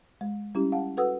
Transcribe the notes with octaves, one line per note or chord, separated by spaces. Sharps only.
G#3
G3 C#4 E4 G4
F5 F#5 A5
F#4 A4 B4 F#5 D#6 E6